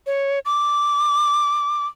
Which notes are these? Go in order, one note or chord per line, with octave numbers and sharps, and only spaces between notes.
C#5
D6